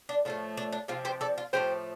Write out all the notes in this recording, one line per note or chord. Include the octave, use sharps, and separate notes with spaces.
D4
A2 F3 A3 F4
D4
D4
C3 F3 C4 F4
G4 C5
A4 D5
F4
A2 F3 A3 G4 C5